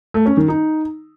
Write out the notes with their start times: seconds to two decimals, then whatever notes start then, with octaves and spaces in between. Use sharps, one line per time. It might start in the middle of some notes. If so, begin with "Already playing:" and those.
0.14 A3
0.26 C#4
0.37 D#3
0.48 D#4